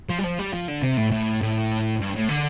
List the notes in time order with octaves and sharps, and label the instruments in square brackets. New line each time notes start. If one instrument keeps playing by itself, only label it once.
[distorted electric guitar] F3
G3
F3
G3
F3
D3
C3
A2
A2
A2
G2
A2
D3